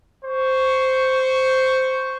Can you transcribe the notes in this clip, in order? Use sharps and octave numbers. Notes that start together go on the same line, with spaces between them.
C5 C#6